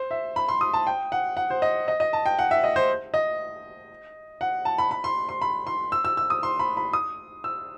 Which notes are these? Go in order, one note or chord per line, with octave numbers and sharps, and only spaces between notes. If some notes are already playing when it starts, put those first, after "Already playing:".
Already playing: C5
E5
B5
C6
D#6
A5
G5
F#5
F#5
C5
D#5
D#5
D#5
A5
G5
F#5
E5
D#5
C5
D#5
F#5
A5
B5
B5
C6
C6
B5
C6
E6
E6
E6
D#6
C6
B5
B5
D#6
E6